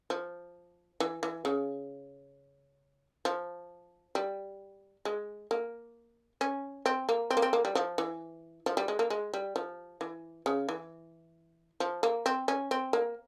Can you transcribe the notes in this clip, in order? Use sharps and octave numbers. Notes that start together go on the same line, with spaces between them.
F3
E3
E3
C#3
F3
G3
G#3
A#3
C#4
C4
A#3
C4
A#3
C4
A#3
G3
F3
E3
F3
G3
G#3
A#3
G#3
G3
F3
E3
C#3
E3
F3
A#3
C4
C#4
C4
A#3